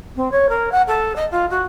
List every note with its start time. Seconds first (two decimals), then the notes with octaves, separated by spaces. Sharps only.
0.16 C4
0.31 C#5
0.49 A#4
0.71 F#5
0.87 A4
1.15 D#5
1.31 F4
1.50 F#4